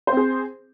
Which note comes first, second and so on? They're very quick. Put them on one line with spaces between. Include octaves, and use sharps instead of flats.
C5 C4 G#4